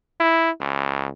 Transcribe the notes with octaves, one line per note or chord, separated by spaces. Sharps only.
E4
C#2